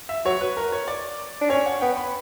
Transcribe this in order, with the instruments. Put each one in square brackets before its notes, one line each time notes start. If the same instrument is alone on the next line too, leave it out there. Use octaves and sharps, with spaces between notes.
[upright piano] E5
[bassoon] F#3 [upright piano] C#5
[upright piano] B4
A#4
C#5
D5
[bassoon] D4
[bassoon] C#4 [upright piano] C#5
[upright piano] F#5
[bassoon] B3 [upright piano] G5
[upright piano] B5